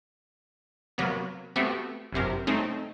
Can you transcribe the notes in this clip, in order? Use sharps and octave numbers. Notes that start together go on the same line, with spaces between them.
C3 F#3 A#3 B3
A3 B3 C4 F#4 G4
G1 F#2 C3 A#4
A3 C4 C#4 D#4